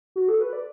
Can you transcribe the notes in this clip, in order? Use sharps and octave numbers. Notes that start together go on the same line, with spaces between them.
F#4
A4
B4
D5